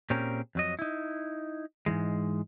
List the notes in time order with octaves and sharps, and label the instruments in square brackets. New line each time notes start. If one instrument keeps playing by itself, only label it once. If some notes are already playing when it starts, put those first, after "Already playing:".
[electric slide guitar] A#2 C4 C#4 G4 G#4 A#4
F2 F#3 D#5
D#4 E4
G#2 C#3 E3 G#3